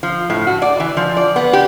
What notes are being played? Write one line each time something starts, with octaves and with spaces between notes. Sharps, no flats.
F3
A2
F#4
D5
E3
F3
D5
B3
G4